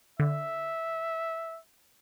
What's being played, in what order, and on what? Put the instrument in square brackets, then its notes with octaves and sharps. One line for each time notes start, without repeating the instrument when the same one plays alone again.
[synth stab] D3 [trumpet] E5